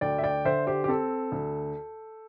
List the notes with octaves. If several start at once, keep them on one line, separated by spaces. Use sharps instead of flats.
D2 D5 G5
E5
D5 G5
D3 C5 E5
G4 C5
G4
C4 A4
D2